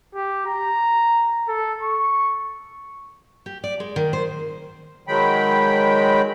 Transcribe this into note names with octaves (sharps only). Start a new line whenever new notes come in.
G4
A#5
A4
C#6
G4
D5
G#3
D#3
C5
D#3 F#3 G#3 G5 B5